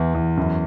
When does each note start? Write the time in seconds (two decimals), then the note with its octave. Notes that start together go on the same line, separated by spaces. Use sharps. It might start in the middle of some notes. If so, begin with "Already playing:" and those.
Already playing: E2 E3
0.14 E2
0.37 F#2